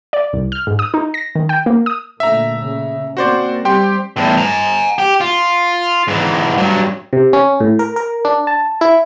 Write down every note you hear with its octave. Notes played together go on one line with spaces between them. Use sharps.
D5
C2
F6
G#2
D#6
D#4
A#6
D#3
G5
A#3
D#6
A#2 D3 A3 E5 A#5
C#3
A#3 C4 F#4 C5 D5
G3 C4 G4 G5 C6
E2 A2
G#5 A#5
G4
F4
G#2 E3
G2 F#3
C3
C#4
A2
A#4
A#4
D4
A5
E4